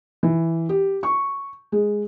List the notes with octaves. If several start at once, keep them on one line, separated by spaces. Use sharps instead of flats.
E3
G4
C#6
G#3